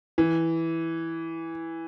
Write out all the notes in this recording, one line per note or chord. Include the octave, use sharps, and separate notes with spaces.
E3